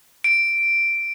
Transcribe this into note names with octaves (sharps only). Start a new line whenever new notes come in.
D7